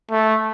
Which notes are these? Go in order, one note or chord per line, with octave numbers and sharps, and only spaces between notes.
A3